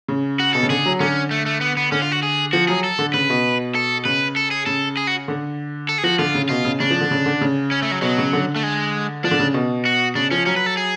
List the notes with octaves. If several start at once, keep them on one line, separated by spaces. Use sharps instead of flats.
C#3
F#4
B2 A4
C#3
D3 G#4
F#3
D3 C#4
A3
A3
B3
B3
D3 C#4
F4
F#4
G#4
F3 F#4
F#3 G#4
A4
D3
C#3 B4
B2
A4
C#3 B4
A4
G#4
C#3 A4
G#4
F#4
D3
A4
G#4
F3 F#4
D3 F4
C#3
B2 F4
C#3
C#3 D4
F3
D3
C#3
D3
C#3
C#4
A3
F#3
B2 F#3
C#3
D3
A3
G#3
F3 D4
D3
C#3
B2
F#4
C#3 D4
F3 C#4
F#3 C#4
B4
A4
G#4